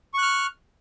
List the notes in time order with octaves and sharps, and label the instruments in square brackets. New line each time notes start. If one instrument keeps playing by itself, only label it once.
[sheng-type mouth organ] C#6
F#6
F6